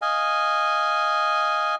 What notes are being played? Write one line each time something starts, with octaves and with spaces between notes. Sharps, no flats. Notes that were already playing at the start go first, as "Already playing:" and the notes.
D#5 F5 G#5